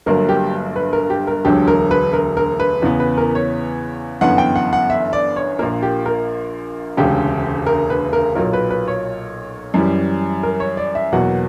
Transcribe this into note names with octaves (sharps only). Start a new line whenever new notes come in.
G1 G2 F#3 A#3 A#4
G4
B4
A#4
G4
A#4
E1 D2 D3 F#3 G4
A#4
B4
A#4
A#4
B4
E2 C#3 E3 B3
B4
A#4
C#5
G1 F#2 E3 B3 F#5
G5
F#5
F#5
E5
D5
C#5
A#1 A#2 A#3 A#4
G4
A#4
E1 D2 C#3 G4
A#4
B4
A#4
B1 A#2 F#3 A#4
B4
B4
C#5
F#2 E3 G3
A#4
C#5
D5
E5
E2 B2 F#3 A#3 F#5